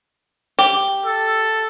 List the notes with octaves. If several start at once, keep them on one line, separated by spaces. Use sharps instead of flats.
G4
A4